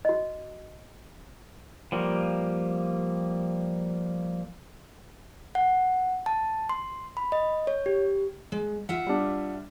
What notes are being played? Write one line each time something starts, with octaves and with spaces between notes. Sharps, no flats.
F#4 D#5
F3 G3 A#3
F#5
A5
C6
B5
D#5
C#5
G4
G#3
F4 E5 F#5
G3 D4